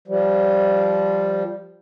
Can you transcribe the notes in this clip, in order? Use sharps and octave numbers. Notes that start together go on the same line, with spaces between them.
F3 G3